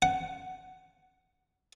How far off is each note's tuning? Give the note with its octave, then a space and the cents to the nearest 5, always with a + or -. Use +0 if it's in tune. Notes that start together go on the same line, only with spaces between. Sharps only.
F#5 +10